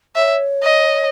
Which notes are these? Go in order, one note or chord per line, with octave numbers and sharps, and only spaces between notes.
C#5 E5
D#5